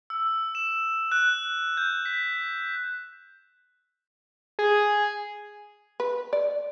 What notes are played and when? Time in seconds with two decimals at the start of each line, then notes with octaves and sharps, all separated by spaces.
0.10 E6
0.55 E7
1.12 F#6
1.77 G6
2.06 B6
4.59 G#4
6.00 B4
6.33 D5